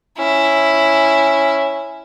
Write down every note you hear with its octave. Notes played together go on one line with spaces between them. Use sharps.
C#4 E4